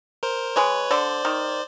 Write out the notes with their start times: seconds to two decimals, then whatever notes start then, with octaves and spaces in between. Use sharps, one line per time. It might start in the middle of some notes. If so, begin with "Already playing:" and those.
0.23 A#4 C5
0.56 G#3 B4 C#5
0.91 D3 C5 D5
1.25 D#3